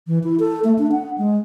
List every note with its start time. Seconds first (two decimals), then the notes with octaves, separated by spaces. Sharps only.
0.07 E3
0.24 E4
0.39 A4
0.64 A3
0.79 D4
0.92 F#5
1.18 G#3